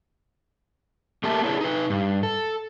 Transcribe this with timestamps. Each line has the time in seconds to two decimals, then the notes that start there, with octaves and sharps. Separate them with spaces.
1.24 A3 A#3 G4 A#4 E5 A5
1.44 D4 E4 G#4 A4 B4 C#5
1.61 D#4 B4
1.90 G2
2.23 A4